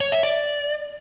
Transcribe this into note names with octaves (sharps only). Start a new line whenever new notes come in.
C#5
E5
D5